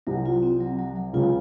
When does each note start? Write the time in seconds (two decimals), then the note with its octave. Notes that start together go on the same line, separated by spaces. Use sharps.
0.07 C2 C3 F#3
0.26 F4
0.43 C4
0.61 F#3
0.79 F#3
0.95 F#3
1.13 C#2 C#3 F4